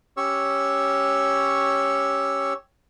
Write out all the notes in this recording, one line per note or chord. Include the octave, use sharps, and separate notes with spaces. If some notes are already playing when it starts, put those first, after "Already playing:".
C#4 G4 C#5 C#6 E6